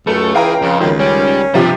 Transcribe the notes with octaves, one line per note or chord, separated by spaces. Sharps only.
C#2 F#2 A3 A4
E3 G#4 F5 G5 A#5
F2 C#3
C#2 F#2 D#3
G3 C#4
G2 C3 F3 G4 C5 E5